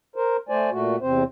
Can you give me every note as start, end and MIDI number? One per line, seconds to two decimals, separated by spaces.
0.16 0.37 70
0.16 0.37 72
0.49 0.70 57
0.49 0.70 72
0.49 0.70 74
0.49 0.70 80
0.71 0.96 46
0.71 0.96 57
0.71 0.96 66
1.01 1.24 40
1.01 1.24 48
1.01 1.24 60
1.01 1.24 72